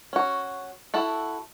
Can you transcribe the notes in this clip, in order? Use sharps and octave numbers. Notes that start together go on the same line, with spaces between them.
C#4 F#4
E4 F#4 A4